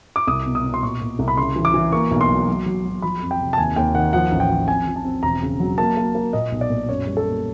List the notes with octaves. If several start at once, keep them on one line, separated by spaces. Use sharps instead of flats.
D6
C2 D#6
B2
D#6
B2
C6
A#2 C#6
A#2
C2
B5
C#3 C6
E3
D6
E3
A#3 C#6
B1
C6
F#3
F#3
F#3
F#3
F3 B5
F2
G5
C3
A5
D#2 G#5
D#2 G5
D#3 F#5
F3 F#5
A1
G5
F3
C4 G#5
F3
A5
C4
E1 A#5
C#3
F#3
A#3 A5
A#3
A#3
A#2 D#5
B1
D5
A#2
F#2 C#5
G3
A4
A#3